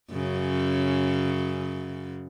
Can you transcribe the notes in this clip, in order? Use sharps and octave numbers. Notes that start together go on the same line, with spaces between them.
F#2 C#3